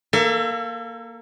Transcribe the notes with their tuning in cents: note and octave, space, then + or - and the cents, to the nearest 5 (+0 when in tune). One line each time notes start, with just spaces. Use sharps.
A#3 +0 A4 +20 E5 +40